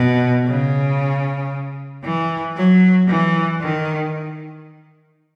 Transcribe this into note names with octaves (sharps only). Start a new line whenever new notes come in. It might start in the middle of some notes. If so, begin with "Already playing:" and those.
Already playing: B2
C#3
E3
F#3
E3
D#3